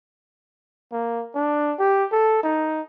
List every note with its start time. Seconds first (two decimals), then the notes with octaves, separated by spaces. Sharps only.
0.93 A#3
1.35 D4
1.80 G4
2.12 A4
2.44 D#4